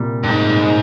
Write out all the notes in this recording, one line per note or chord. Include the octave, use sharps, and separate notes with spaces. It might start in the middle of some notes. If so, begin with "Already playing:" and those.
Already playing: C2 A#2 G3
G2
G#2